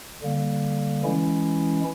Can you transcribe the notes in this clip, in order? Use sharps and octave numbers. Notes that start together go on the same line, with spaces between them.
D3 G3 A#3
E3 G#3 C#4 E4